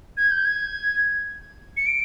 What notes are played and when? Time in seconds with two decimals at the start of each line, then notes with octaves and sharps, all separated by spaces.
0.17 G#6
0.31 G6
0.45 G#6
1.77 C#7
1.87 D7